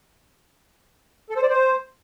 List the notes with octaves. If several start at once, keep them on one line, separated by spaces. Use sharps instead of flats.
A4
C5
D5
C5